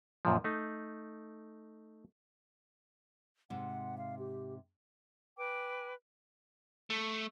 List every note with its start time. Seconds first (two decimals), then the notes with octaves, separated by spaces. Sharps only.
0.25 F#2 A#2 F3
0.44 A3 D#4
3.50 G#2 C3 F#5
3.98 F5
4.19 G4
5.37 B4 G5 G#5 D6
6.90 A3